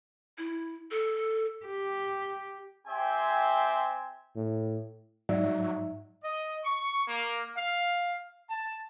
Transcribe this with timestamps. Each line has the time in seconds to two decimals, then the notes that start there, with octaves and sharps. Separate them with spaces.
0.38 E4
0.91 A4
1.66 G4
2.88 C4 G4 C5 E5 G5 G#5
4.36 A2
5.29 G#2 F#3 D#4 D5 E5
6.24 D#5
6.64 C#6
7.08 A#3
7.57 F5
8.50 A5